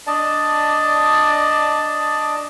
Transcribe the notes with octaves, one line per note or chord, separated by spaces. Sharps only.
D4 D5 D#5 A5